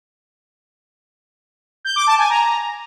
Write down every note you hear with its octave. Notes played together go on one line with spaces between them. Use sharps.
G6
D6
A5
G#5
A#5